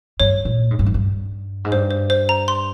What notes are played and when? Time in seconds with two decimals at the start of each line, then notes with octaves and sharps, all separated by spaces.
0.20 G2 C#5
0.45 A#2
0.71 G#2
0.79 G2
0.86 F2
0.94 G2
1.65 G#2
1.72 G2 C5
1.91 C5
2.10 C5
2.29 A#5
2.48 C6